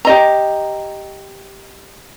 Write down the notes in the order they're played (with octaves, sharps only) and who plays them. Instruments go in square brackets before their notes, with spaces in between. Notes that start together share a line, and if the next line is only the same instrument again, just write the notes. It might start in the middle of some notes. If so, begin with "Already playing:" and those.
[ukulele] G4 D#5 A#5